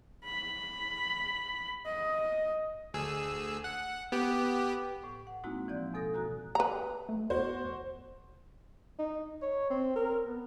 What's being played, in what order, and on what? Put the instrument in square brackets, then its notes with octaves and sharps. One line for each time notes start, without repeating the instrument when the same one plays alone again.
[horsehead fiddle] B5
D#5
[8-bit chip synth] D2 G#4 E6
F#5
B3 G4
[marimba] A2
F#5
G#3 A#3 C4 D#4 E4 F#4
E3 F3 C4 D5 G6
E2 B2 A4 D#6 G6 A#6
F#4 A#5 F#6
[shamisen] B4 A#5
[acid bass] A3
[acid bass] E2 [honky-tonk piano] F#4 C5
[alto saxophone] D#4
C#5
C4
A#4
B3